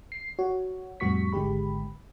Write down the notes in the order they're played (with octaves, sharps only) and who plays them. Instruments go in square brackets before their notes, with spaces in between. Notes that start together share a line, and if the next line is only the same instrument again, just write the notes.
[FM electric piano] C7
F#4 C#5
F2 A2 G3 F#4 C#6 B6
G#1 D3 G#3 G4 B5